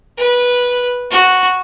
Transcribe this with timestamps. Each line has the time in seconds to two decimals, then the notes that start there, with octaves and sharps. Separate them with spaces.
0.18 B4
1.12 F#4